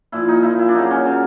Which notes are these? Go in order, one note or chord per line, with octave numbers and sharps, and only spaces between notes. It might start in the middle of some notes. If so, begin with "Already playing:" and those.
A#2 F3 E4
D#4
A#2 E4
F3
E4
D4
C#3 F#3 D#4
C#4
C#3 F#3